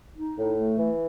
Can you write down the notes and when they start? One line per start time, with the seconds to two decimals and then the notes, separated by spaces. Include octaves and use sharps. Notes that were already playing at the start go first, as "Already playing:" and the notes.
0.17 D#4
0.37 A2
0.57 A3
0.77 E3